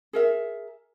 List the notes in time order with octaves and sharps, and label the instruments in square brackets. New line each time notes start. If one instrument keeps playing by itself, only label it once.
[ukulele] G#4 A#4 E5